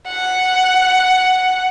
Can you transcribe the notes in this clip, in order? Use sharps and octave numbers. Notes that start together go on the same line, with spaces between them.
F#5